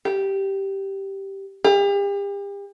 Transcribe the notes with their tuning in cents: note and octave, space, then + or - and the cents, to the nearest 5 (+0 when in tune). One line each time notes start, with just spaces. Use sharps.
G4 -5
G4 +40